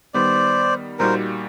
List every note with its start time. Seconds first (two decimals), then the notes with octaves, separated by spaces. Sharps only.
0.14 D#3 G3 B3 C5 D5
0.99 A#2 G3 A#3 D#4 F#4 A#4 C5